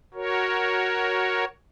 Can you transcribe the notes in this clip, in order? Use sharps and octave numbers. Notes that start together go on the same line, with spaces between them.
F#4 A#4 C#5